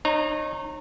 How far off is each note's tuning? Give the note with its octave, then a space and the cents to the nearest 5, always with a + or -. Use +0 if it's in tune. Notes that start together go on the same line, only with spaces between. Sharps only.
D#4 -30 C#5 -30 A#5 +10